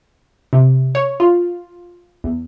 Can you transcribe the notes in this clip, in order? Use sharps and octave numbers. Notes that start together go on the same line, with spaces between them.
C3
C#5
F4
E2